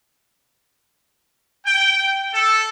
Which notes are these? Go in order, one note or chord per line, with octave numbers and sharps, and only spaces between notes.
G5
A4